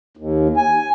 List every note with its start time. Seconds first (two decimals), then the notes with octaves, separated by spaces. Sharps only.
0.17 D#2
0.57 G#5